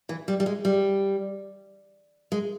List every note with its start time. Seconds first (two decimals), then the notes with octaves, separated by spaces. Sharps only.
0.09 E3
0.28 G3
0.40 G3
0.46 G#3
0.65 G3
2.32 G#3